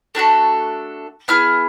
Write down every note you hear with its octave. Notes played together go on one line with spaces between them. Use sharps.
A3 D4 F#4 A4
B3 E4 G#4 F6